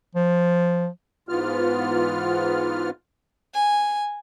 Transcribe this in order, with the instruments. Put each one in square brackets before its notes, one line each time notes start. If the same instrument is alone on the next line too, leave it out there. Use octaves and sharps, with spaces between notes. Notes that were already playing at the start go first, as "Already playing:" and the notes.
[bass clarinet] F3
[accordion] G#2 E3 B3 F4 F6
[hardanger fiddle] G#5